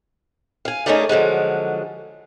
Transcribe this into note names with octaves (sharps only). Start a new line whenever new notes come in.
F5 G#5
A3 C#4 D#4 G#4 A#4 D5
D3 F3 F#3 G#3